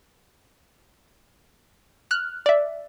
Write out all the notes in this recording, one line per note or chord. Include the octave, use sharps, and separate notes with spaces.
F6 F#6
D5 E5